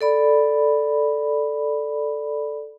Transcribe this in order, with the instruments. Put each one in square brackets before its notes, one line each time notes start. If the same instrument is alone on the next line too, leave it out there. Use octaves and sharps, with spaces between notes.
[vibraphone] A4 D5 B5